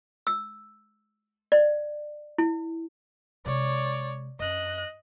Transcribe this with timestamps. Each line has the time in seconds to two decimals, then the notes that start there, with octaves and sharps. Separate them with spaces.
0.27 E6
1.52 D5
2.38 E4
3.46 C3 G#3 C#5 D5
4.40 F#2 D#5 F#6